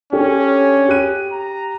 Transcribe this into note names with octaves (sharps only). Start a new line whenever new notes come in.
C#4 D4 G4 A4
G4 F#6 D#7
A#5